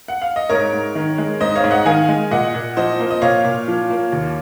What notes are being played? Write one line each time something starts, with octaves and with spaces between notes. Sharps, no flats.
F#5
F5
D#5
G#2 A#4 C#5
G#2
D#3
G#3
G#2 C5 D#5
C#5 F5
G#2
D#5 F#5
D#3 F5 G#5
G#3
A#2 D#5 F#5
A#2
F3 C5 D#5
A#3
D#5
A#2 C#5 F5
A#2
F3
A#3
D#2